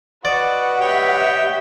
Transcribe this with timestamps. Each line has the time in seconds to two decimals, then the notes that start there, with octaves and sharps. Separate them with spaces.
0.25 F#4 B4 D5 D#5 F#5
0.81 G4 C#5 D#5 E5 G5